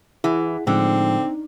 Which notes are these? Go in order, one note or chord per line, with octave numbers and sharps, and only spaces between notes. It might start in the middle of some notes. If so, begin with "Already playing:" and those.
E3 E4 G#4 F#5
A2 D3 F3 G#3 C4 D#4